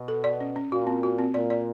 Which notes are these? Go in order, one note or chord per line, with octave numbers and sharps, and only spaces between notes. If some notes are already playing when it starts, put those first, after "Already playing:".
Already playing: B2
A4
D5
C#4
C#4
A#2 F#4
C4
F#4
C4
A#2 D5
D5